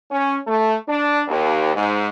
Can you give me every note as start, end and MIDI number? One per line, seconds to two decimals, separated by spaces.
0.11 0.36 61
0.47 0.74 57
0.88 1.23 62
1.28 1.71 39
1.75 2.08 44